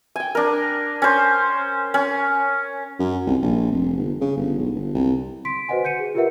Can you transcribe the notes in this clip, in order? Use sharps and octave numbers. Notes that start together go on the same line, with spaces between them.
G5 G#5
D4 A#4
C#4 C5
C#4
F#2
C2
A#1
F1
G1
C#3
G1
B1
G1
C2
C6 B6 D7
F#4 B4 C5 D#5 F#5 G#5
G6 C#7 D#7
G#4
F4 G4 A#4 B4 E5 F#5